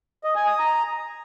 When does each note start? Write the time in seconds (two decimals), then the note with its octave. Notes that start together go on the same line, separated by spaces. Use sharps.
0.24 D#5
0.36 G#5
0.47 D#6
0.59 A#5